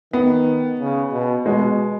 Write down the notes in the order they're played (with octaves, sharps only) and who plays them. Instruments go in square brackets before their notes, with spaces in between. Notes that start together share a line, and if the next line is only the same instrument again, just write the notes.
[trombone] D#3 [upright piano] B3
[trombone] C#3
B2
[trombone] B2 [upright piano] G#3